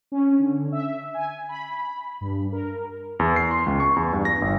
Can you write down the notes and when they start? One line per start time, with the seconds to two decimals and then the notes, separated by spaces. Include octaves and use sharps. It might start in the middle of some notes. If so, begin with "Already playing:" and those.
0.12 C#4
0.39 D3
0.72 E5
1.14 G#5
1.49 B5
2.21 G2
2.52 A#4
3.19 E2
3.36 C7
3.51 C6
3.66 C#2
3.80 C#6
3.96 E2
4.13 G2
4.25 A#6
4.42 G1